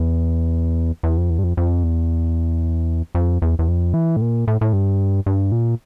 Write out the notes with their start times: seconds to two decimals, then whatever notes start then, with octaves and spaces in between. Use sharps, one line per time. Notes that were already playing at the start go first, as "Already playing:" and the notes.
Already playing: E2
1.03 E2
1.18 F2
1.30 E2
1.39 G2
1.44 F2
1.57 F2
1.84 E2
3.15 F2
3.42 E2
3.59 E2
3.68 F2
3.94 E3
4.16 A2
4.21 A#2
4.48 A2
4.61 A2
4.73 G2
5.26 G2
5.52 A#2